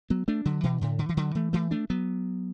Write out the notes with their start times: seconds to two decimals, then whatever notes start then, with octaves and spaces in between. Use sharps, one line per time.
0.10 F#3 B3
0.28 A3 D4
0.45 D3 F#3
0.63 B2 E3
0.81 A2 D3
0.99 D3
1.09 E3
1.17 D3 F#3
1.35 E3 A3
1.53 E3 A3
1.71 A3 D4
1.90 F#3 B3